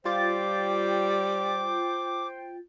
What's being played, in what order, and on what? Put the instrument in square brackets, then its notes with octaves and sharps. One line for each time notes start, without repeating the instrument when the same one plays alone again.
[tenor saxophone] G3 [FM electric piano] F4 A6 [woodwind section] C5 G5 [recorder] D6